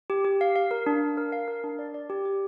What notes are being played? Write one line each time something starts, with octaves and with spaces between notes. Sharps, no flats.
G4
G4
F5
F5
A#4
D4
F5
A#4
F5
A#4
D4
D5
D5
G4
G4